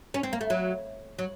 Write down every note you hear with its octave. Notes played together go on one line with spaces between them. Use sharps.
C#4
C4
A#3
A3
F#3
F#3